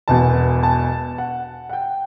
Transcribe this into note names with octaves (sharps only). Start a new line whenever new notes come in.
E1 E2 B2 A5
A5
F#5
F#5
G5